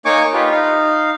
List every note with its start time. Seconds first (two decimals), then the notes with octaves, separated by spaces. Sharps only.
0.05 A#3 D#4 C#5 G#5 C#6 D6
0.33 D#4 F4 G4 B4
0.52 D#4 F5